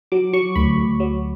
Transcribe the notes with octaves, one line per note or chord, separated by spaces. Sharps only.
F#3 D6
F#3 C#6
D2 B5
D2
F#3